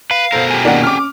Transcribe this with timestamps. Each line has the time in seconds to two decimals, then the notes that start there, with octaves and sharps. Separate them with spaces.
0.11 B4 F5
0.32 B2 A4 A#4 C5
0.51 G4 G#4
0.65 D#3 A#3 C#4 D5 F#5
0.83 C#4 D6 F6